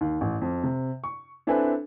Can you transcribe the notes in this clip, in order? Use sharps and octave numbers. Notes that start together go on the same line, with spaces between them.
D#2
A1
F2
C3
C#6
C4 D4 E4 A4 B4 G#5